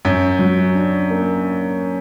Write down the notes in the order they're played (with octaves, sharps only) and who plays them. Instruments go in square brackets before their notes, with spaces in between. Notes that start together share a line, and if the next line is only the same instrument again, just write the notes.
[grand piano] F#2 [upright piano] F#3
[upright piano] F#3
D4
A#3